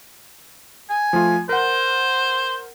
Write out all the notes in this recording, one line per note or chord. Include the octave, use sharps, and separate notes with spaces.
G#5
F3 A3 F4
A#4 C5 F#5